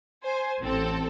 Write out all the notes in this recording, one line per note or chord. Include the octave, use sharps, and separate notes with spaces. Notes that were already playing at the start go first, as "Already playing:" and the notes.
C5 G#5
A1 C4 A4